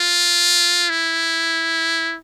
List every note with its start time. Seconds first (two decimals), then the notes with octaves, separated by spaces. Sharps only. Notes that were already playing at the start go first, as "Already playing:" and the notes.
Already playing: F4
0.90 E4